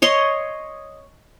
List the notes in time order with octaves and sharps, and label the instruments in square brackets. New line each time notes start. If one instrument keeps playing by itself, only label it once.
[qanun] C#5 D#5 C6